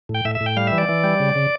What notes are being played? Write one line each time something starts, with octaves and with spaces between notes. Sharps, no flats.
A2
G5
A2 E5
E5
A2
G5
G3 F5
E3 E5
D5
E3
G3
C#3
C#3